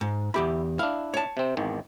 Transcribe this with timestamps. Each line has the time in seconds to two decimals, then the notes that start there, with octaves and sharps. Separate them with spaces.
0.01 G#2
0.34 E2 E4 G4 B5
0.79 D4 E4 F5
1.14 C#5 A5
1.37 C3 C4
1.57 G#1 E2 D#3